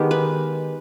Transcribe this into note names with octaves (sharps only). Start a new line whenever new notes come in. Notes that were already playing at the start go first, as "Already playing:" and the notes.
Already playing: D#3 G#3 B3 G4
B4